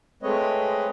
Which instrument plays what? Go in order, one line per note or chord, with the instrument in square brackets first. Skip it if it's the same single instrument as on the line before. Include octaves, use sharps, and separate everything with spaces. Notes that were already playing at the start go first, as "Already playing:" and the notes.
[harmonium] G#3 A3 C4 B4 C#5 D#5